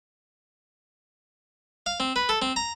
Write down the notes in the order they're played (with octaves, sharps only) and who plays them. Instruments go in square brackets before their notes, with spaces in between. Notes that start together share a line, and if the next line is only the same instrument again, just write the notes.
[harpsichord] F5
C4
B4
A4
C4
A#5